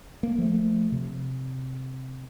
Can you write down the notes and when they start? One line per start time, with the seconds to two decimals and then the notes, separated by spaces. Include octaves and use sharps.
0.23 A#3
0.38 F3 A3
0.92 C3